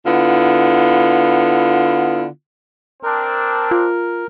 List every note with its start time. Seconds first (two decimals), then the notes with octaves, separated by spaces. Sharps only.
0.07 D3 B3 E4 F4
3.03 C4 D4 A#4
3.71 F4